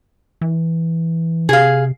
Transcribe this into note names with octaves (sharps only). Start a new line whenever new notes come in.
E3
C3 G#4 F5